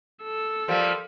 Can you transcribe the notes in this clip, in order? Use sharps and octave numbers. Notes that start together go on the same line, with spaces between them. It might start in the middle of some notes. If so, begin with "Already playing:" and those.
A4 E6
F3 G3 A#3